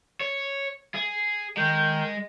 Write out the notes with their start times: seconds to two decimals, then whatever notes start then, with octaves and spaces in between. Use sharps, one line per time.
0.21 C#5
0.95 G#4
1.57 D#3 G#3 G6